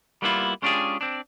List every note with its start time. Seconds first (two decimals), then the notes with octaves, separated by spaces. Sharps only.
0.22 G3 A#3 B3 C#4 E4 F4
0.62 G#3 C#4 D4 F4 G4 G#4
1.01 C4 D4